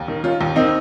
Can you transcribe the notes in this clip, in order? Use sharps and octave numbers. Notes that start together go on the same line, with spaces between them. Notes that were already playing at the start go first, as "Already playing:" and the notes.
Already playing: D#2
D#3
D#3 C#4 F4
D#2
D#3 C4 D#4